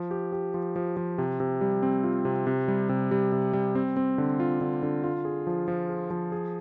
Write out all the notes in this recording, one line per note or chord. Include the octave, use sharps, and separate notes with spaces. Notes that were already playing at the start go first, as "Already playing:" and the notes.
Already playing: F3
G4
G4
F3
F3
F3
C3
C3
G3
C4
F4
C3
C3
G3
C3
G3
C3
G3
C4
C4
D3
F4
D3
D3
F4
G#4
F3
F3
G#4
F3
G#4